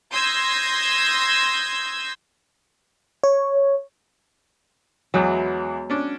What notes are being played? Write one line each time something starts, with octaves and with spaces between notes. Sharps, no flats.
C6 D#6 E6 G6 G#6 A#6
C#5
E2 E3 F#3 G#3 B3
C#4 D4